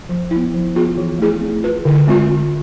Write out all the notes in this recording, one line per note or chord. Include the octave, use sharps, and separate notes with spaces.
F3
E4
B3
F3
B3 F4 G#4
E3
A3 E4 G#4
C4
F4 B4
D3
G#3 C4 F4